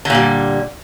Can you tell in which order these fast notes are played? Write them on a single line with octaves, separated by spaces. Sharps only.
D3 A#2 G3